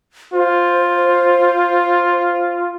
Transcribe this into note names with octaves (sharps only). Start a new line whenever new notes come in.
F4 C5